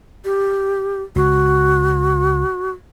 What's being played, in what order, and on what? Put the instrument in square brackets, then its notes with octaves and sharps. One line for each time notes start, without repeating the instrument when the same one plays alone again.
[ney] G4
[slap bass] C#2 [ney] F#4